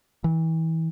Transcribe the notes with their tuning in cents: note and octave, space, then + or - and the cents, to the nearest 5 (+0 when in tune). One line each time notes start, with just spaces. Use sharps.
E3 -30